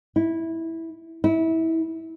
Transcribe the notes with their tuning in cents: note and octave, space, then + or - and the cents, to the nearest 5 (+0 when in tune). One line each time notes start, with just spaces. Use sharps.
E4 -10
E4 -25